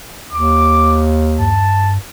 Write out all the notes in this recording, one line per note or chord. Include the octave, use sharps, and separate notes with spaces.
D#2 D6
G2 A5